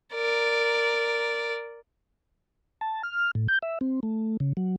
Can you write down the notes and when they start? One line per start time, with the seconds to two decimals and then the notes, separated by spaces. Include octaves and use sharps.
0.14 A#4 D5
2.81 A5
3.03 F6
3.35 A2
3.48 G6
3.62 E5
3.81 C4
4.03 A3
4.40 C#3
4.57 F#3